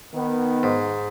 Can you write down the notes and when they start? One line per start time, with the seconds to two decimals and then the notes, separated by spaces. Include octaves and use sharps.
0.14 D#3 B3
0.63 G#2